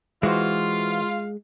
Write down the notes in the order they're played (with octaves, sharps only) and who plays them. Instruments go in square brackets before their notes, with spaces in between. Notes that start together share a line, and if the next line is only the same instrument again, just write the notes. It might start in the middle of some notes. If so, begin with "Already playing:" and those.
[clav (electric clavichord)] E3 F#4 C5 [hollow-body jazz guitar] G#3 [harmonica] F4 F5